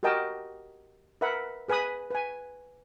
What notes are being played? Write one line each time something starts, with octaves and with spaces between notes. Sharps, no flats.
F#4 G4 A#4 D#5 G5 A5
A#4 B4 E5 F#5 B5
G#4 B4 G#5 B5 D#6
B4 G#5